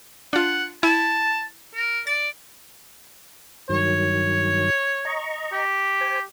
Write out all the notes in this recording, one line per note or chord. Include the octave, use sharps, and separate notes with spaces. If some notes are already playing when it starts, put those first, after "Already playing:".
D4 F4 F#5
E4 A5
A#4
D5 A6
G2 D#3 F#3 C#5
D#5 A#5 C#6
G4
C5 G#5